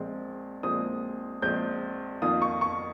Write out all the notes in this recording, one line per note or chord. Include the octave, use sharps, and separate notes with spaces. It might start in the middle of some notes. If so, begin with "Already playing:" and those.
Already playing: A#1 A#2 G#3 C4
A#1 A#2 G#3 C4 D#6
A#1 A#2 G#3 C4 G6
F2 D#3 A#3 F4 D#6
C#6
C#6